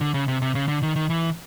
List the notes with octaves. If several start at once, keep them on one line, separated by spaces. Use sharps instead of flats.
D3
C#3
C3
C3
C#3
D3
D#3
D#3
E3